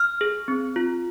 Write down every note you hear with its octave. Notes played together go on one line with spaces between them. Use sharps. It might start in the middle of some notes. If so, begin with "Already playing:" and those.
Already playing: F6
G#4
C4
F4